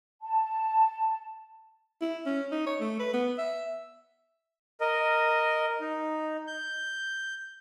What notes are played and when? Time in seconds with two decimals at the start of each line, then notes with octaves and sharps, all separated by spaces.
0.22 A5
2.01 E4
2.26 C#4
2.52 D#4
2.66 C#5
2.80 A3
2.99 B4
3.13 B3
3.38 E5
4.81 A#4 D#5
5.80 D#4
6.47 G6